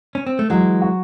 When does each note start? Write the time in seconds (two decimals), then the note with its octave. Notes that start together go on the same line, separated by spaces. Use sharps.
0.15 C#4
0.27 C4
0.39 A3
0.50 E3 F#3 G#3
0.82 F#4